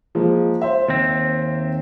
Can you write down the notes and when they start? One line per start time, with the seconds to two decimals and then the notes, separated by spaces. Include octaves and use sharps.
0.15 F3 G#3 A#3
0.62 C5 E5
0.88 D#2 C4